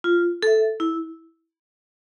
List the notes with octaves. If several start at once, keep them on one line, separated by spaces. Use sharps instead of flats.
F4
A4 E5
E4